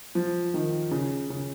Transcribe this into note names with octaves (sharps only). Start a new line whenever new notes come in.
F3
D#3
C#3
C#3